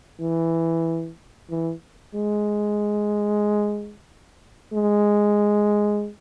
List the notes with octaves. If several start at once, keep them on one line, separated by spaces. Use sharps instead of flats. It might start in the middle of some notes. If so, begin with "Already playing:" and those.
E3
E3
G#3
G#3